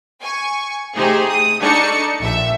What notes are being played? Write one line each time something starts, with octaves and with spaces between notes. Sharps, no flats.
G#5 C#6
C3 A3 D#4 G4 G#4 C5
D#6
D4 D#4 A4 C#6 C#7
A#1 E5